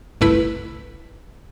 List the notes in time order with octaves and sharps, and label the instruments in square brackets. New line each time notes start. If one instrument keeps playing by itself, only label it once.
[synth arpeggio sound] G1 C2 A3 E4 B4 B5